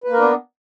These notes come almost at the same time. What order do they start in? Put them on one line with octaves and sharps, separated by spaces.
B4 A#3 A#4 D4 B3